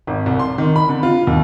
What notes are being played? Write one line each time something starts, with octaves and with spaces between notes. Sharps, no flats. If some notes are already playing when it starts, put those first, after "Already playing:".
G#1
C2
C6
D#3
B5
D3
F4
D#2